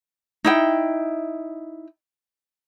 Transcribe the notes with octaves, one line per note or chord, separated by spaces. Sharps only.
D#4 E4 G5